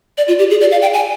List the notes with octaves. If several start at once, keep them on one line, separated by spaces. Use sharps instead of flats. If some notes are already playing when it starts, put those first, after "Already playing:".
D5
F4
G4
G#4
D5
F5
G5
G#5